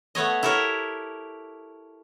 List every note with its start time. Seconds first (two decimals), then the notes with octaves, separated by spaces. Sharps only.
0.15 A3 B3 C#5 D#5
0.43 E4 G4 A4 A#4 C#5